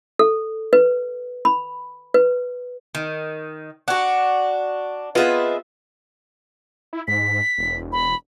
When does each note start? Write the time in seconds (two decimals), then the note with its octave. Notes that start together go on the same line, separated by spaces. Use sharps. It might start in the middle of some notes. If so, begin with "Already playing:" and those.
0.19 A4
0.73 B4
1.45 B5
2.14 B4
2.95 D#3
3.88 D4 F#4 F#5
5.15 B3 C4 F4 G#4 B4 D#5 E5
6.93 E4
7.08 G#2 B6
7.58 E1
7.92 B5